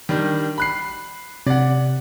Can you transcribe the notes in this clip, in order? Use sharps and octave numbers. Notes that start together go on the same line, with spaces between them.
D#3 G3 D4
B5 F#6 C7
C3 D5 F#5